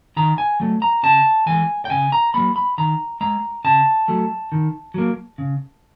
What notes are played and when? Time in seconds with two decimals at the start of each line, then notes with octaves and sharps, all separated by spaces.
0.17 D#3 A#5
0.38 G#5
0.60 F#3 A3
0.82 A#5
1.03 C#3 A5
1.46 E3 G#3 G#5
1.85 G5
1.90 C#3 G#5
2.12 A#5
2.34 F#3 A#3 B5
2.56 B5
2.78 D#3 A#5
3.21 G#3 A#5
3.64 C#3 A5
4.08 F#3 A3
4.52 D#3
4.94 F#3 A#3
5.38 C#3